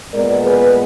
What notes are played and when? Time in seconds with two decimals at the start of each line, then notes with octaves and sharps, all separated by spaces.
0.13 A#2 G#3 B3 A#4 D5
0.45 G#4 B4